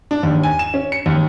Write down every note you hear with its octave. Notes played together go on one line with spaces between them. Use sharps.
D4
D#2
G#5
E7
C#4
C#7
D#2